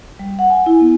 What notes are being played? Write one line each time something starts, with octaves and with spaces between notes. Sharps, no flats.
G3
F#5
G#5
E4
B3